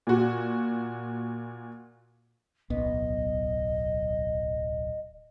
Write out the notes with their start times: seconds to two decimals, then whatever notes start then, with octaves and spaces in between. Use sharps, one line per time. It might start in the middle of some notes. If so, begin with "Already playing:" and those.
0.07 A#2 F#4
2.70 D1 B1 B3 D#5